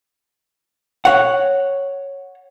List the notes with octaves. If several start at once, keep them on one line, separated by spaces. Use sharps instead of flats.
C#5 F#5